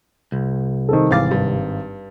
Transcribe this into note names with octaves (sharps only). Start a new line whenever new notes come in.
C2
D#3 C4 A4
G#1 E3 F5 D6 A6
G2